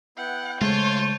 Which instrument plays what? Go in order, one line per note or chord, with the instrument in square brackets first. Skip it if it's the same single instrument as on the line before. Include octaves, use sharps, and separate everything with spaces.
[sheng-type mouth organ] B3 E4 G5 [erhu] F#5
[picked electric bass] C#3 G#3 A3 [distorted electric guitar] F4 [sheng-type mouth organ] C5 A5 [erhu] C#5